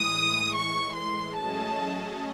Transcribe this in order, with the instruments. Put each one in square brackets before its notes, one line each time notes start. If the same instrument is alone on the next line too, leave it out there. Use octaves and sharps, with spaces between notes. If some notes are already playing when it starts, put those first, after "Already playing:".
Already playing: [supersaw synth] A2 E3 G#3 [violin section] D#6
[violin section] C#6
C6
[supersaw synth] F#3 A3 C#4 G#4 D#5 [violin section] A5